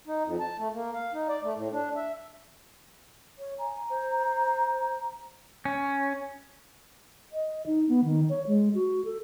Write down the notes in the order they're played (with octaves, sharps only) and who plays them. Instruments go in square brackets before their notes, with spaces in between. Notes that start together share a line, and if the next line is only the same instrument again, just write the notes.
[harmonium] D#4
F2
A5
A3
A#3
F5
D#4
D5
A3
A2
D4
E5
[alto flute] C#5
[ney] G#5 [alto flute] A#5
[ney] C5
[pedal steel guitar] C#4
[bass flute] D#5
D#4
B3
D#3
C#5
G#3
F#4
A4